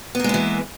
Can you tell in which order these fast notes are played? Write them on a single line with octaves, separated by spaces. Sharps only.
B3 A#3 G#3 E4 E3